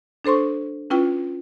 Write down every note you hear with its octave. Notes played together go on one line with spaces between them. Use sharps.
D4 A4 C5 C6 C#6
C#4 E4 F4 B4 G5